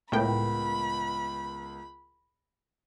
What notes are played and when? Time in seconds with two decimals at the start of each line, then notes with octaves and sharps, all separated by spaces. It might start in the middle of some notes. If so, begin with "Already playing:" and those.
0.12 C#2 A2 B3 A#4 G5 B5